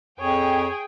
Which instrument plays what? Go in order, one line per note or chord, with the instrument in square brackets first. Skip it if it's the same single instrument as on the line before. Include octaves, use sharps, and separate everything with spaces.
[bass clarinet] F2 [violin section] G#4 G5 [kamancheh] C#5